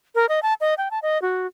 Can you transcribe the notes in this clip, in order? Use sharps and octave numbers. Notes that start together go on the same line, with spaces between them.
A#4
D#5
A5
D#5
G5
A5
D#5
F#4